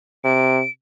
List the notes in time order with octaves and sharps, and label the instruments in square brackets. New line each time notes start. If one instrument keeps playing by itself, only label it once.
[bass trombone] C3 [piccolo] D7